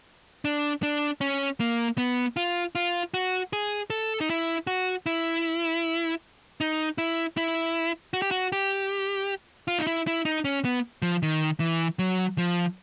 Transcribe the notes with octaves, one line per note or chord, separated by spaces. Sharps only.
D4
D4
C#4
A#3
B3
F4
F4
F#4
G#4
A4
D#4
E4
F#4
E4
D#4
E4
E4
F#4
G4
F#4
G4
F4
D#4
E4
E4
D#4
C#4
B3
F3
D#3
E3
F#3
F3